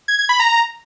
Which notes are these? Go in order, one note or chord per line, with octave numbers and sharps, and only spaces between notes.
G#6
G#6
B5
A#5